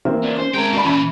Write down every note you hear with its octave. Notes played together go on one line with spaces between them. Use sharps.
E3 A#3 C4
B3 D4
C#4 C5
G#3 G#4 A#4 G5
C2 A#3 F#4 D5 B5
A#2 E3 C#4 B5